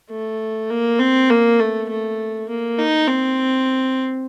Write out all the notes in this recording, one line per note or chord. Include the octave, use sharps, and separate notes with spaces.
A3
A#3
C4
A#3
A3
A3
A#3
D#4
C4